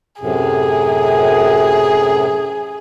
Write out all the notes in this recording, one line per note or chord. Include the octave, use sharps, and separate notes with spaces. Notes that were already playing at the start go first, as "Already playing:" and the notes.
F#2 A2 C3 G#4